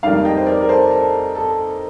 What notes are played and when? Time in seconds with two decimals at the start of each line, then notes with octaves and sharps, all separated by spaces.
0.03 F2 D#3 G3 A#3 D5 F5
0.25 D#5 G5
0.37 C5
0.47 A#4 D5
0.61 A#4
0.69 A4 C5
0.91 A4
1.35 A4